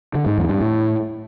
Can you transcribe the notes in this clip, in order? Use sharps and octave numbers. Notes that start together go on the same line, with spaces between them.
D3
G#2
E2
G2
A2